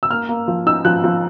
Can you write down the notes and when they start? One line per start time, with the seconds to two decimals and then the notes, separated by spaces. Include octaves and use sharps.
0.03 E6
0.10 A#3 F6
0.29 A#3
0.48 F3
0.66 D#4 E6
0.85 F3 F#6
1.04 F3